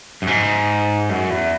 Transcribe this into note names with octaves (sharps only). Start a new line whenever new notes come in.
F#2
G#2
F#2
E2